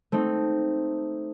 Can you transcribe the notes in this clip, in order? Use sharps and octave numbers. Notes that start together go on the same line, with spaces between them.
A3 C4 D#4